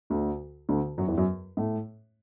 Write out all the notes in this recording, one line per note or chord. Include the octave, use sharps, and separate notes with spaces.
D2 D3
D2 D3
F#2 F#3
E2 E3
F#2 F#3
A2 A3